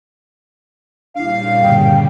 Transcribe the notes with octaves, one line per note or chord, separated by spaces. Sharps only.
A#2 C#3 G3 D4 E4 F5
G2 B2 D3 G5